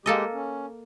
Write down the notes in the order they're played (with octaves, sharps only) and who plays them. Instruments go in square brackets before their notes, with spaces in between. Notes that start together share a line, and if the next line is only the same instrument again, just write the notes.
[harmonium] G#3 G4 [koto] A#3 A4 D#5
[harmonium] C#4